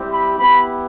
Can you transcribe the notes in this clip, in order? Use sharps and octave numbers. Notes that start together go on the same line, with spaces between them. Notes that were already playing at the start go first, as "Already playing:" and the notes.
Already playing: G3 C4 E4 G4
B5
B3 E4 G4 B5